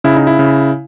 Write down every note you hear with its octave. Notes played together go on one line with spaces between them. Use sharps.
C#3 E4
D#4
E4
C#3